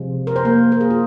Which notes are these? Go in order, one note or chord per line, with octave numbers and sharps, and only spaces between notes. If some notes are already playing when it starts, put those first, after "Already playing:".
Already playing: C3 F3 G#3
A#4
C5
A#3 A#4
A#4
G#4
F4